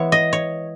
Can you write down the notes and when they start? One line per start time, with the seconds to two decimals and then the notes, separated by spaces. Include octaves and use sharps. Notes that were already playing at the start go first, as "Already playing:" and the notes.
Already playing: E3 G#3 B3 E4 C#5
0.12 D#5
0.33 C#5